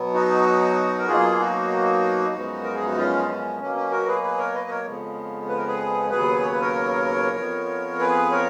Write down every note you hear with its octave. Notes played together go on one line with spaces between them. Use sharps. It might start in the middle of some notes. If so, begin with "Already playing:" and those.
Already playing: B2 F#3 B3
D#4 F#4
A#4
B2 F#3 A#3 F4 G#4
D#4 F#4
F#2 F3 G#3 B3
A#4
G#4
F#4
C#4 F4
D#4
C#4
B2 F#3 A#3 C#4
C#4
F#4 A#4
G#4 B4
G#4 B4
A#4 C#5
B4 D#5
A#4 C#5
F2 C#3 F3 G#3 B3
B4
A#4
G#4 B4
D#2 C#3 F#3 B3 G#4 B4
C#5
B4
A#4 C#5
F2 F3 B3
G#4 B4
A#4 C#5